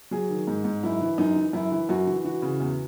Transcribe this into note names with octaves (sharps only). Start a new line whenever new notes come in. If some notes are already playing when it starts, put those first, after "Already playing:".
F#3 G#4
D#3
G#2
G#2
F#2 E4
E3
F#2 D#4
E3
F#2 E4
E3
F#2 F#4
E3
E3 F#4
C#3
E2